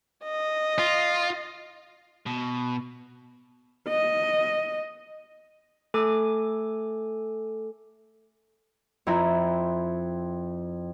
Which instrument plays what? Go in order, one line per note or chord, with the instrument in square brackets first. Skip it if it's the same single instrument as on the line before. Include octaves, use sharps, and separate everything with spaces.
[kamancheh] D#5
[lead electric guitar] F4
[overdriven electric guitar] B2
[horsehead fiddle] D#5
[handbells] A3 A4 G#5 D6
[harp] F2 E4 A#5 G6